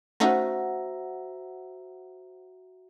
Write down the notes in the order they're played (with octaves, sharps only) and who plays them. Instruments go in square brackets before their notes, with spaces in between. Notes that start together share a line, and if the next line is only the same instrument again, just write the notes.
[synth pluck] A3 C#4 D#4 [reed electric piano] F#4 E5 A#5 [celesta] C5 F#5